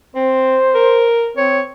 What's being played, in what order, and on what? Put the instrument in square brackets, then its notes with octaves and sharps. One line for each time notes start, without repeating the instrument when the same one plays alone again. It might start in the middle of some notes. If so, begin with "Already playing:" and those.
[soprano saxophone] C4 [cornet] C5
[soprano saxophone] A#4
[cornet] C4 [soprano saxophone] C#5